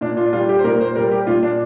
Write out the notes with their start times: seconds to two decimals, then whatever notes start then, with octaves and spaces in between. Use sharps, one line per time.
0.01 A#2 D4
0.17 F4
0.26 D4
0.33 G3 F4
0.49 G4
0.59 C5
0.64 A#2 A#4
0.81 C5
0.95 G3 A#4
1.12 G4
1.27 A#2 F4
1.43 D4